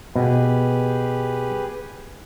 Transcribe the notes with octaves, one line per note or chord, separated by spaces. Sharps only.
B2 G4 G#4 B4